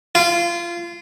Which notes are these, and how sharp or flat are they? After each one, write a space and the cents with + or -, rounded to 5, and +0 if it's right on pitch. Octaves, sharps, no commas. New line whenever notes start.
F4 -25